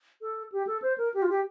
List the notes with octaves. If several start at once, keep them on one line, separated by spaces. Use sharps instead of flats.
A4
G4
A4
C5
A#4
G4
F4
G4